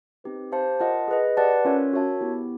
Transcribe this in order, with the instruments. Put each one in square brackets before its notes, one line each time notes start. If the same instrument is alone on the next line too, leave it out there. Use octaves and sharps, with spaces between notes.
[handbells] C4 D#4 G4 B4
G4 C5 F5 A5
F4 A#4 D#5 F#5 A5
G#4 B4 D#5
G4 B4 D5 F#5 A5
C#4 F4 A#4 C#5 E5
F#4 A#4 C#5 E5 A5
B3 E4 G4